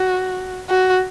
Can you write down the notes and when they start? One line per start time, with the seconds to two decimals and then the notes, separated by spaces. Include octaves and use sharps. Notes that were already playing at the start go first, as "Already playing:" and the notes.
Already playing: F#4
0.69 F#4